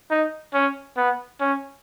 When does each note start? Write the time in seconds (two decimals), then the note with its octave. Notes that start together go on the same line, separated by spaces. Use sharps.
0.10 D#4
0.53 C#4
0.97 B3
1.40 C#4